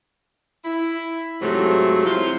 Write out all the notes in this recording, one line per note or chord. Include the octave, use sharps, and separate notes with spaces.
E4
G#2 C3 F3 F#3 A3
C3 F3 E4 F4